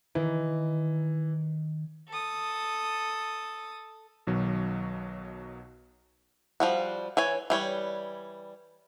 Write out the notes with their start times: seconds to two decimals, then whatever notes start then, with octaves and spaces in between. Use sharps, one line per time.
0.15 D#3 E3
2.09 A4 D#6
4.27 B1 B2 D#3 F#3
6.60 F3 G3 F#4
7.17 E3 C#5 G#5
7.50 E3 G3 C#5